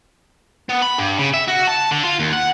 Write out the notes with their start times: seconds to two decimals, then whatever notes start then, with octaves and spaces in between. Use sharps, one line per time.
0.69 B3
0.82 B5
0.99 G2
1.19 C#3
1.34 E5
1.48 F#4
1.67 A5
1.91 D3
2.04 F4
2.19 D#2
2.33 F#5